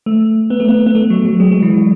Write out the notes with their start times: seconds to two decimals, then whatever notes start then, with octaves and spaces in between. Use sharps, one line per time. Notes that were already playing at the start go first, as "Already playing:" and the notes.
0.06 A3
0.50 B3
0.60 A3
0.68 B3
0.86 B3
0.95 A3
1.10 F#3
1.25 F#3
1.40 G#3
1.51 G#3
1.62 E3
1.74 F#3